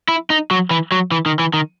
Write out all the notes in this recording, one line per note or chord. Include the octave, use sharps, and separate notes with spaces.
E4
D#4
F#3
E3
F#3
E3
D#3
E3
D#3